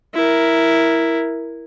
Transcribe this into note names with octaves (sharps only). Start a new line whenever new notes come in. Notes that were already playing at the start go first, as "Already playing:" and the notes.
E4 A#4